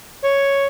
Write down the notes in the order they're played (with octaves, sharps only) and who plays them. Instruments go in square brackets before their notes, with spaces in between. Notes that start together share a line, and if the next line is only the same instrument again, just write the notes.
[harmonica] C#5